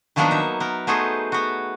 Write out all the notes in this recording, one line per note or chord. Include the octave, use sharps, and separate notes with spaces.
D#3 F3 F#3 A#3 B3 D4
D#4 E5
B3 A#4
F#3 A3 B3 D#4 G#4 C5
B3 F#4